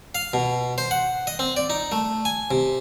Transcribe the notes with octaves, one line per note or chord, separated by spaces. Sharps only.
F5
B2
C5
F#5
D#5
C4
D5
D#4
A3
G#5
C3